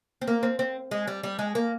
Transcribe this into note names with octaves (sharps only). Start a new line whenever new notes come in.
C4
A#3
C4
C4
G#3
G3
G3
G#3
A#3